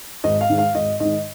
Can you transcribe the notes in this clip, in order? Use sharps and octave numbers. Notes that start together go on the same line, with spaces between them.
G#1 D#5
F5
G#2 D#3
F5
G#1 D#5
G#2 D#3 D#5